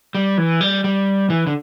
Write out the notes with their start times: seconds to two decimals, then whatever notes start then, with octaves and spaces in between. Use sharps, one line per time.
0.15 G3
0.38 E3
0.61 G3
0.84 G3
1.30 E3
1.47 D3